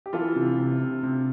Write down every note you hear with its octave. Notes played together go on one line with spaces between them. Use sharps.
G4
E3 F4 A4
C3
C3
C3
C3